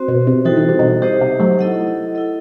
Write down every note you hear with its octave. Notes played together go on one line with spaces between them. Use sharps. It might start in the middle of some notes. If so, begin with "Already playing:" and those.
Already playing: C4 F#4 C5
B2
C3
E3 G3 D#4 F#4 A4 C5
D#3
C3
B2 D#3
C3 D#4 G4 C5 D#5
C3
F#3 A3
E4 A4 D#5 F#5
E4 A4 D#5